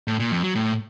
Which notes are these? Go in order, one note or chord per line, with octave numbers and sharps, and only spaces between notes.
A2
A#2
F2
F#3
A2